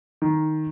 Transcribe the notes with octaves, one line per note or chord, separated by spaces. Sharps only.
D#3